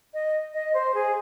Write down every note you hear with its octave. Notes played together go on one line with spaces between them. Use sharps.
D#5
D#5
C5
G#4